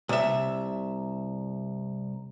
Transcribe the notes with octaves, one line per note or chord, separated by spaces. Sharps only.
C2 E5